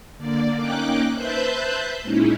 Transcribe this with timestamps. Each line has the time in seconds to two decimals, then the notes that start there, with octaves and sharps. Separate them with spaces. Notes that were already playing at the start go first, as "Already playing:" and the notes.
0.17 D3 A#3 D5
0.57 A#3 C#4 D#4 G5 D6 F#6
1.14 B4 C5 E5 A5 F#6 G6
2.01 A#2 G#3 C#4 D#4 E4